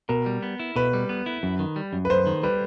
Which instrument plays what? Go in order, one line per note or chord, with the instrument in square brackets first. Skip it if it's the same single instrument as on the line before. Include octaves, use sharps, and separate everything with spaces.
[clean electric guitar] B2 [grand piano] A#4
[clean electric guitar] G3
B3
E4
[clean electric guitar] B2 [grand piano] B4
[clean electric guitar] G3
B3
E4
F#2
D#3
G3
F#2
[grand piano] B4
[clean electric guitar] F#2 [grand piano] C5
[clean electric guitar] D#3
[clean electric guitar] G3 [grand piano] B4